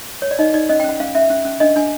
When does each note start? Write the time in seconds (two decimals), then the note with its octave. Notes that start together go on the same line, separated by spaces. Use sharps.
0.22 C#5
0.31 D5
0.39 D#4 D#5
0.54 D#4 D5
0.69 C#4 D#5
0.80 G5
0.84 C#4 F#5
1.00 C#4 F5
1.15 C#4 E5
1.30 C#4
1.45 C#4
1.60 D4 D#5
1.76 D4 G#5